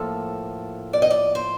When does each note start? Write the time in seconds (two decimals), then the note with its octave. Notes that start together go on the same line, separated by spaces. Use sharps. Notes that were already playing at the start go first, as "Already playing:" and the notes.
Already playing: A2 F3 A#3 A4
0.93 D5
1.02 D#5
1.10 D5
1.35 C5